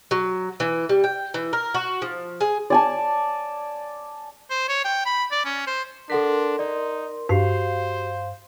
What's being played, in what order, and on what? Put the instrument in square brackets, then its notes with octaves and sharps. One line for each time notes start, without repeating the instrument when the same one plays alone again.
[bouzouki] F#3
E3
G3
G5
E3
A#4
F#4
F3
G#4
[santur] D5 G#5 A5
[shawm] C5
C#5
G5
B5
D5
C#4
C5
[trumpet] D4 [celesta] A4 F#5 B6 [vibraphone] A#4 C6
[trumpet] D#4 [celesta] D5
[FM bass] G2 [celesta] F#4 G4 C7 [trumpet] C5 [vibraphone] F5